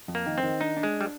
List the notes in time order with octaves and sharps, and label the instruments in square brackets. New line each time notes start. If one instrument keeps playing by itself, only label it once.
[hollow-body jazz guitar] F2
[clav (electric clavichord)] A#3
[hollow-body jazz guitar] D#3
[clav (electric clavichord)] C4
[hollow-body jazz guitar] D#3
[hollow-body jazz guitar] D4 [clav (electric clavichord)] D#4
[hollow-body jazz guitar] D4
[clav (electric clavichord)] G#3
G3